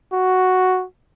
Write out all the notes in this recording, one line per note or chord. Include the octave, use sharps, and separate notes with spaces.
F#4